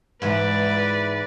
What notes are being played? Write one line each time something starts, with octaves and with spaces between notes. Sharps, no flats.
G#2 E3 B4 D5